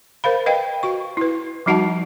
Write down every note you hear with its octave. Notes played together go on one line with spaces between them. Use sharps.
A#4 C5 F5 B5
B4 D#5 F5 G5
F#4 C#6
E4 B4
F3 G3 D#4 F#4 F#5 A5